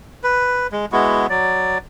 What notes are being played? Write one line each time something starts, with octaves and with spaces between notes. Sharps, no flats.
B4
G#3
G#3 B3 E4 F#4
F#3 D5